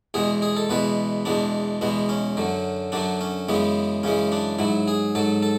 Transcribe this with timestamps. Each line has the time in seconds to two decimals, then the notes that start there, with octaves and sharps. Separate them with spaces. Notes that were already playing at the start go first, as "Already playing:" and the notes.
0.14 E2 B2 G#3 G#4
0.42 G#4
0.57 A4
0.70 E2 B2 G#3 B4
1.25 E2 B2 G#3 D4
1.81 E2 B2 G#3 B3
2.09 C#4
2.37 F#2 D3 F#3
2.92 F#2 D3 F#3 D4
3.21 C#4
3.49 F#2 C#3 E3 G#3 B3
4.03 F#2 C#3 E3 G#3 C#4
4.32 D4
4.59 G#2 F#3 E4
4.88 G#4
5.15 G#2 F#3 A4
5.43 A4